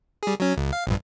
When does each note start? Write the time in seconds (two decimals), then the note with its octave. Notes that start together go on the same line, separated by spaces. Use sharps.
0.23 G3 G#4
0.40 F#3 C#4
0.57 C#2
0.73 F5
0.87 A#1 G2